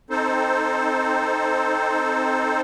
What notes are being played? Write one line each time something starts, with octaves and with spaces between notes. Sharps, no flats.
C4 D#4 A4 C5